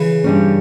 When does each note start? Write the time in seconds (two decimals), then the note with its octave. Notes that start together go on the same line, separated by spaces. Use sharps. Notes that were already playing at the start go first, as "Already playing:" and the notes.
Already playing: C#3 E3
0.24 G2 G3 C#4